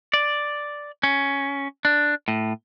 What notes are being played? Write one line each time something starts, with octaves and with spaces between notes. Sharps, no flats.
D5
C#4
D4
A2